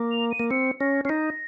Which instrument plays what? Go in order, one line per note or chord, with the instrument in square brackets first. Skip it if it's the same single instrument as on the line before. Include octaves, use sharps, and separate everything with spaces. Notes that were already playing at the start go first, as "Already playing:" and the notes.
Already playing: [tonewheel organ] A#3
[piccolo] F7
D#7
[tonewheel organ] A#3
[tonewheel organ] C4 [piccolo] C#7
[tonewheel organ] C#4 [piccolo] A#6
[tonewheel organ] C#4 [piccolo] C7
[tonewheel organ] D#4 [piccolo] A#6